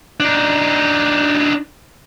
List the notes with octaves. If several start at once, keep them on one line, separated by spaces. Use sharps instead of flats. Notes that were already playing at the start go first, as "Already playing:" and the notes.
D4 D#4